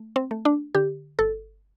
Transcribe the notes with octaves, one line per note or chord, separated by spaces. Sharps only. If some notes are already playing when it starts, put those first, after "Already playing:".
Already playing: A3
C4
A3
D4
D3 G4
G1 A4